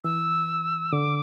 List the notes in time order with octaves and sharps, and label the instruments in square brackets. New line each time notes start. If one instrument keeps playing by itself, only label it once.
[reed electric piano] E3 [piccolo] E6
[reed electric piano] D3 [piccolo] D6